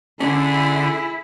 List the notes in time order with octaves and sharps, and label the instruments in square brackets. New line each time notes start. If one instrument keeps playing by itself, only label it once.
[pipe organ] D3 [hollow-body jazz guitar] C#4 D4 [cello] E4 [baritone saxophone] G#4